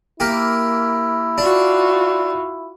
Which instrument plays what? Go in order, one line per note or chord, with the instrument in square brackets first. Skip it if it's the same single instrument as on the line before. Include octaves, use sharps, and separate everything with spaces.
[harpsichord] A#3 G4 [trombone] E4
[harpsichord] D4 [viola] F4 F#4